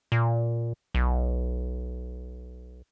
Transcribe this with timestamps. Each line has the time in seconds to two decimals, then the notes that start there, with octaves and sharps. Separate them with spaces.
0.12 A#2
0.95 B1